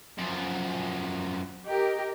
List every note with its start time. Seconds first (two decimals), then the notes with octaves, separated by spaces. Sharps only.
0.18 F#2 F3
1.66 G4 A#4 D#5